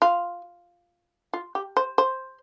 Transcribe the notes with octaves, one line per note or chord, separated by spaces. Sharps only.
F4
F4
G4
C5
C5